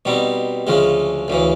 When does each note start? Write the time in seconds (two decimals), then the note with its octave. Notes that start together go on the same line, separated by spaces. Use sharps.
0.05 B2 G3 C4 D#4
0.67 D2 C#3 F3 G#3
1.28 D2 C#3 E3